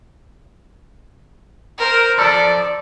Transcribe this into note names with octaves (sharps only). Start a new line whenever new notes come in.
A#4 C5
F3 A4 D5